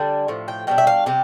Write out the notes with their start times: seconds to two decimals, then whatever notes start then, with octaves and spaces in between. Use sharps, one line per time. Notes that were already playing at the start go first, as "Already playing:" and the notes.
Already playing: D3 G3 D4 G5
0.28 A2 F3
0.48 G5
0.67 B2 G3 D4 G5
0.78 E5
0.87 F5
1.06 C3 G3 G4